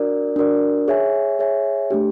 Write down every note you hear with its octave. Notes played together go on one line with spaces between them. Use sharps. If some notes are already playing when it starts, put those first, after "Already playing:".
Already playing: D4 F#4 A#4 D5
D4 F#4 A#4 D5
G#4 C#5 E5 G#5
G#4 C#5 E5 G#5
A3 D4 G4